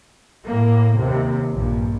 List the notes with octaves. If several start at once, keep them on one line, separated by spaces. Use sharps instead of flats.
A2 A#3
D#2 C3
A#1 G2